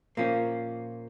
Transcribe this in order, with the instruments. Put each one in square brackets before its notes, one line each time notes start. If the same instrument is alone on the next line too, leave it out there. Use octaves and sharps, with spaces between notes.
[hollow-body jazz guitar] A#2 F3 A#3 C#4